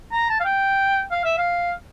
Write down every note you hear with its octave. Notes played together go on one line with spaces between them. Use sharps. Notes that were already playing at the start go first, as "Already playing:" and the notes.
A#5
A5
F5
G5
F5
E5
F5